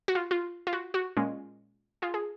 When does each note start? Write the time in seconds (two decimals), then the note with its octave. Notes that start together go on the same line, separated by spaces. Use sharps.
0.08 F#4
0.15 F4
0.31 F4
0.67 F4
0.73 F#4
0.94 F#4
1.17 A#2 G#3 C#4
2.02 F4 G#4
2.14 G#4